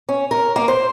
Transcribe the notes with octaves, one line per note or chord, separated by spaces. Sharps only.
C#4
A#4
A#3
C5